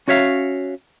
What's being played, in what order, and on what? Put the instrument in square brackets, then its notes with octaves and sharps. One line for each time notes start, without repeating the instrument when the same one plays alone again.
[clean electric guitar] C#4 F#4 C#5 E5 F5